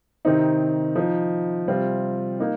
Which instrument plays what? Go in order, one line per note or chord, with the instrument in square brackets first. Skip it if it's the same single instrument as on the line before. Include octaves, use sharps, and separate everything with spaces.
[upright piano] C3 D#3 C4 D#4
F3 D#4
C3 G3 C4 F4
A#3 D#4